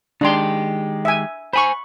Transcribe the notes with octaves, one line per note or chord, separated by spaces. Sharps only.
D#3 G#3 D4 G4 C6
E5 G#5
C5 G#5 B5 C#6